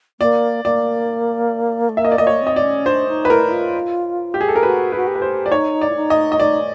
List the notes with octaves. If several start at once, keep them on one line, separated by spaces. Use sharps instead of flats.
A#3 D5
A#3 D5
A3
A#3 E5
D#5
D5
A#3 D#5
C#5
C4 D#5
D5
C#4
D4 C5
D#4
B4
E4 A#4
E4
F4
G4
G#4
A4
A#4
F#4 B4
B4
F#4
G4
B4
C5
D5
D#4 C#5
D5
E4
D#4
D#5
D#5
D#4 D5